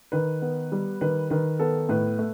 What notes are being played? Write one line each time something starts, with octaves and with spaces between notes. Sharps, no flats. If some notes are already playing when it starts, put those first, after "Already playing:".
D#3 B4
B3
G3
D#3 B4
D#3 B4
B3 A4
A2 B4
A3